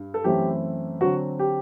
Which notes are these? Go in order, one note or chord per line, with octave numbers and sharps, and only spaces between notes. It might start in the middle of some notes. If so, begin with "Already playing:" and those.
Already playing: G2
A4
F#2 E3 A3 C4 E4 G4
D3 F#3 C4 F#4
G4